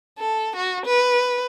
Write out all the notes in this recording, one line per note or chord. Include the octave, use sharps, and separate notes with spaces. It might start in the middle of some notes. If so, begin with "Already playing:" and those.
A4
F#4
B4